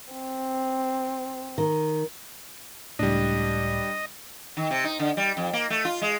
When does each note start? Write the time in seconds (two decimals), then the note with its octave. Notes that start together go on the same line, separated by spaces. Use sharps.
0.13 C4
1.58 D#3
2.99 C#2 A2 G3 D4 D#5
4.57 D#3
4.71 C3
4.84 D#4
4.99 D3
5.17 G3
5.37 F2
5.53 A#3
5.70 A3
5.85 F4
6.02 G#3